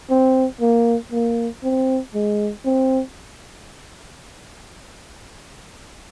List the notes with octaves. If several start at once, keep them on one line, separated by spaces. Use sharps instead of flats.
C4
A#3
A#3
C4
G#3
C4